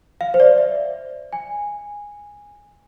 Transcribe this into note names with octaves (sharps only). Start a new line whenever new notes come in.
F5
C5
D5
E5
G#5